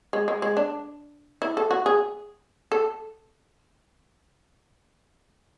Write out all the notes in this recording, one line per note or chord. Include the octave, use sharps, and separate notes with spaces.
G#3
G#3
G#3
D4
E4
A4
F#4
G#4
A4